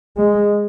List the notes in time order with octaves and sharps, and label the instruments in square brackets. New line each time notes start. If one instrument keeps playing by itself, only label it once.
[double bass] G#3